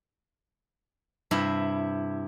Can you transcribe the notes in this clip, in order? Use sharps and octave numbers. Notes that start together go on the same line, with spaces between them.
G2 C3 E4